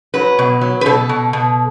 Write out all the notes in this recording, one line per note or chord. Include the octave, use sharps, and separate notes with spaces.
F#3 B4
B2
F#3
B4
B2 A4
B2
B2